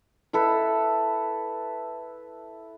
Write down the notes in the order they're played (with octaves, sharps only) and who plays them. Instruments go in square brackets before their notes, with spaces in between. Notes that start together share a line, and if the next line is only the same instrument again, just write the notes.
[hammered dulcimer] E4 A4 B4